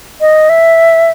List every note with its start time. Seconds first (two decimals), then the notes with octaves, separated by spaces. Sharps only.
0.21 D#5
0.49 E5